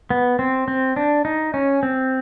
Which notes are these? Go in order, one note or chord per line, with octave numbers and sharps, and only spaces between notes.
B3
C4
C4
D4
D#4
C#4
C4